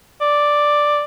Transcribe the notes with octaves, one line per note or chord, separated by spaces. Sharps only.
D5